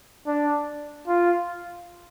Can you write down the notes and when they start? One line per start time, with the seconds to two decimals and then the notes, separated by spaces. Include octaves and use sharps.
0.27 D4
1.08 F4